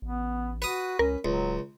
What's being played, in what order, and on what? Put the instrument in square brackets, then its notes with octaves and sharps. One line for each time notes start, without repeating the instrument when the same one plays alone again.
[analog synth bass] A1 [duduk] B3
[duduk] F#4 [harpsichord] B4 D#6
[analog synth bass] C#2 [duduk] C#4 [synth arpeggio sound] A#4
[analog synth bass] D1 [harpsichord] C#2 [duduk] F#3